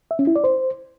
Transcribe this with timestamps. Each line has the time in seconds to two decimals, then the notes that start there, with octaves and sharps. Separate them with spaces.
0.11 E5
0.19 C#4
0.27 E4
0.36 D5
0.44 C5